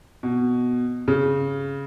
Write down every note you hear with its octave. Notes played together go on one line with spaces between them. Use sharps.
B2
C#3